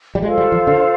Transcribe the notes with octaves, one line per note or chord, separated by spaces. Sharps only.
G3
G#3 F4 A4 C5 F5
G3
F3
D3